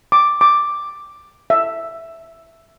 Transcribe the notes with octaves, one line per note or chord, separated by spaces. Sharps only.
D6
D6
E5